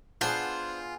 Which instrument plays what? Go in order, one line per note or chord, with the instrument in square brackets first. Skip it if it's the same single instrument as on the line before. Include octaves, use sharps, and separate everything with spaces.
[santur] B3 G#4 [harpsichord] D4 F#5 [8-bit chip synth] F4 [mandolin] C5